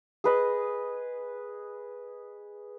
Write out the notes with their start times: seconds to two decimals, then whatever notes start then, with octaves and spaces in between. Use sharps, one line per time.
0.24 G#4 B4 D#5